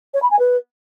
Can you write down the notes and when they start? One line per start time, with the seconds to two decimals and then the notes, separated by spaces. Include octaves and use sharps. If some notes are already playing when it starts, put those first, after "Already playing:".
0.14 C#5
0.22 B5
0.31 G#5
0.39 B4